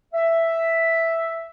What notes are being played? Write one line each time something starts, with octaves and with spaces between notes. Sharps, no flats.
E5